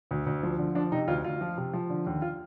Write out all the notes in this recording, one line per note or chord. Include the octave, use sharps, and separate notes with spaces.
D2
D2
F3
D3
F3 D4
C3 D#4
D2 F4
D2 F4
F3
C3
F3
D3
D#2
F4